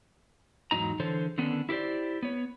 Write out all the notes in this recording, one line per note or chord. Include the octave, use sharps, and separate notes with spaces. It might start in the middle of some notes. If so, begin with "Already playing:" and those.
E2 G#2 F3 F#3 D#4 A#5
D3 E3 G#4 A4 C5 C#5
D3 D#3 B3 C#4 D4 A4
E4 G4 A4 C5 D5
B3 C#5